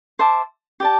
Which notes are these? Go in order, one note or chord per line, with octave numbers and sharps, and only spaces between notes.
C5 E5 A5 D6
G4 D5 A5